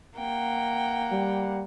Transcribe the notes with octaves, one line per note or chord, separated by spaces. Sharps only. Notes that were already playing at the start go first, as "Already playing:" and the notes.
A#3 F#5 G5
G3